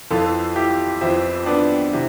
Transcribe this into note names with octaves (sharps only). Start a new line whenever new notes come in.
F2 E3 F4 A4
E4 G4
F2 E3 C4 E4
B3 D4
C3 E3